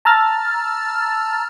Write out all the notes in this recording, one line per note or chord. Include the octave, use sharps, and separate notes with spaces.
A5 A#5 E6 F6 A6